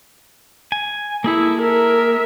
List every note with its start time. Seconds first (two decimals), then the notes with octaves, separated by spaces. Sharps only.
0.72 G#5
1.24 A#3 E4 G#4 A4
1.61 A#4 E5